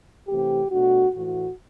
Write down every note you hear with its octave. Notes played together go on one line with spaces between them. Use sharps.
C3 E3 A3 C4 G4
B2 A3 D4 F#4
A2 E3 A3 F#4